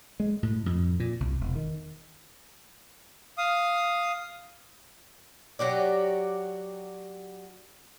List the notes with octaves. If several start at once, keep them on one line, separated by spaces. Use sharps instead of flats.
G#3
A2
F2
A#2
C2
E1
D#3
F5 D#6
F#3 F#4 G4 D5